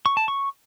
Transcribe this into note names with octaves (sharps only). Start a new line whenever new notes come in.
C#6
A5
C#6